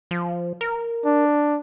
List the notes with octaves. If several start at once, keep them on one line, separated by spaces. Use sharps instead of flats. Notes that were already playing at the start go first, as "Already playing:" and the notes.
F3
A#4
D4